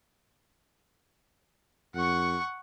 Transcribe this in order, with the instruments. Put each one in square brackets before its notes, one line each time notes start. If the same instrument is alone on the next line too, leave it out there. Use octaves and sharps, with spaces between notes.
[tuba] F2 [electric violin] F#5 C#6